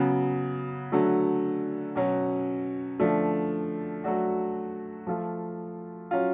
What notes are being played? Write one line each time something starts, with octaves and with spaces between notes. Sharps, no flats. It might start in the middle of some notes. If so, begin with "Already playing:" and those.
Already playing: C#3 F#3 B3
D3 F#3 A3
B2 F#3 C#4
D3 F3 A3 D4
F#3 A3 D4 F#4
F3 A3 F4
F#3 C#4 F4